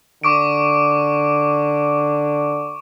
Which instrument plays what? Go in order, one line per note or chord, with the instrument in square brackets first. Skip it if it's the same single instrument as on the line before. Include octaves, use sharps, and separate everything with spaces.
[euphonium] D3 [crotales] C#6 D6 D7